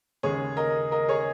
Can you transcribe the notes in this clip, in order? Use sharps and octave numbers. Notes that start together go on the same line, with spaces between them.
D#2 C#3 G#3 G#4 C#5
A#4 D#5
A#4 D#5
G#4 C#5